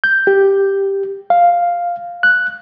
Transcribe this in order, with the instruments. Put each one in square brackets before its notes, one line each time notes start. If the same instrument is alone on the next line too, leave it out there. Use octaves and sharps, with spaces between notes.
[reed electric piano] G6
G4
F5
F#6